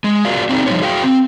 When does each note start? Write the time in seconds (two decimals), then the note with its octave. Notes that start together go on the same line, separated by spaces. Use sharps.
0.04 G#3
0.25 F4 F#4 G#4 A#4 D5 F5
0.49 C4 D4 D#4 G#4
0.67 F3 G3 G#3 D#4 C5 C#5
0.82 F#4 G#4 F5 G5
1.03 C4